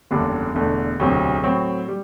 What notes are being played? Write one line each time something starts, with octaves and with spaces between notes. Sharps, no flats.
F#1 E2 D3 G3 D4
E1 E2 D3 A3
E1 D2 C3 F#3 C4
A2 F#3 C4
G3